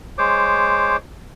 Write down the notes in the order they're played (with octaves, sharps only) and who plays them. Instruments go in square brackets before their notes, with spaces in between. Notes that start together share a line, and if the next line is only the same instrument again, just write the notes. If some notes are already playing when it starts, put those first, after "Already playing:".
[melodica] G#3 C5 C#5 D6